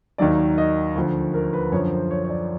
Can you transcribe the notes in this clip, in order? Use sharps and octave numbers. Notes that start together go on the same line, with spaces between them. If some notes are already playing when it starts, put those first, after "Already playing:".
D#2 D#3 F#3 D5
D#5
D2 D3 F3
A#4
B4
F#2 D3 F3 C#5
C5
C#5
C#5
D5